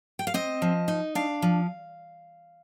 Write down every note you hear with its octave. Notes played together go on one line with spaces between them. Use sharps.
G5
F5
C4 D#5
F3
D#4
D4 F5
F3